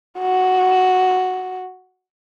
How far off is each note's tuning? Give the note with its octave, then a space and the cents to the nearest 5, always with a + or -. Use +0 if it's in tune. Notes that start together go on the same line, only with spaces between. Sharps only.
F#4 +0